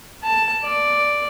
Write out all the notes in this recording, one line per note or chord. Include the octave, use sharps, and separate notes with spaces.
A5
D5